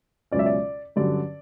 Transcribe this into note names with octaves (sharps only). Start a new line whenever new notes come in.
C#2 B2 F#3 C#4 D5
E5
D5
G2 D3 F#3 C#4 D5